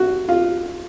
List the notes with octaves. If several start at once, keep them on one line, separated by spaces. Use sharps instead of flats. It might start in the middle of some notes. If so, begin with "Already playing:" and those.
Already playing: F#4
F4